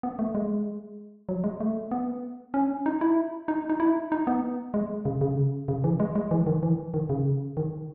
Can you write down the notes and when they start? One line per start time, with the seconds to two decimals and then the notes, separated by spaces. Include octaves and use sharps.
0.03 B3
0.19 A3
0.35 G#3
1.29 F#3
1.44 G#3
1.60 A3
1.91 B3
2.54 C#4
2.86 D#4
3.01 E4
3.48 D#4
3.69 D#4
3.80 E4
4.12 D#4
4.27 B3
4.74 G#3
5.05 C#3
5.21 C#3
5.68 C#3
5.84 E3
6.00 G#3
6.15 G#3
6.31 E3
6.47 D#3
6.63 E3
6.94 D#3
7.09 C#3
7.57 D#3